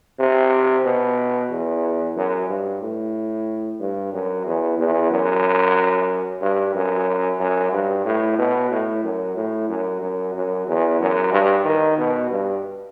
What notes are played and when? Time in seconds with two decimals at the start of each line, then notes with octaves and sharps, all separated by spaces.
0.19 C3
0.85 B2
1.50 E2
2.16 F#2
2.48 G2
2.81 A2
3.80 G2
4.13 F#2
4.45 E2
4.78 E2
5.10 F#2
6.41 G2
6.74 F#2
7.39 F#2
7.72 G2
8.05 A2
8.38 B2
8.71 A2
9.03 F#2
9.36 A2
9.68 F#2
10.01 F#2
10.34 F#2
10.67 E2
11.00 F#2
11.32 G2
11.65 D#3
11.97 B2
12.30 G2